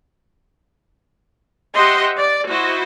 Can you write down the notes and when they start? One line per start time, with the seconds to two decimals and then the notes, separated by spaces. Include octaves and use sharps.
1.76 G4 C5 D#5 E5 F#5 C6
2.17 D5
2.48 E4 F#4 C5 D#5